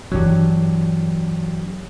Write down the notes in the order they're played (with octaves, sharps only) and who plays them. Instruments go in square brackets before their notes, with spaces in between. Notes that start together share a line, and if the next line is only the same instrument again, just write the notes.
[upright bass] G2 E3 [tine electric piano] F#3 D4 G4